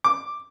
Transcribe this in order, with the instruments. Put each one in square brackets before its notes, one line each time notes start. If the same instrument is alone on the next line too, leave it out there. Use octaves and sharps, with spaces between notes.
[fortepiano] D6